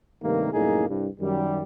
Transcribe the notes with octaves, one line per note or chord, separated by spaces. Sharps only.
G2 C3 D#3 A3 A#3
C2 F#2 A2 A#3 D#4 G#4
C2 G2
F#2 D#3 G3